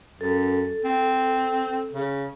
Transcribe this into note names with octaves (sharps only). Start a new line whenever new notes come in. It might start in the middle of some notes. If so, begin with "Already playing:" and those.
F#2 A4
C4
C#3